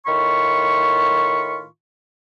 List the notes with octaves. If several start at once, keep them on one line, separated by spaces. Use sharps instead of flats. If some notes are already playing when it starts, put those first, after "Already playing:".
A2 D#3 F4 B5 C#6